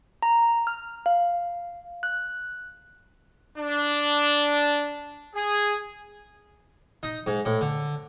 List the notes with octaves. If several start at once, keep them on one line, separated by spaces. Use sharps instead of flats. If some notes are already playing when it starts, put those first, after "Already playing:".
A#5
F6
F5
F#6
D4
G#4
D#4
G#2
A2
D3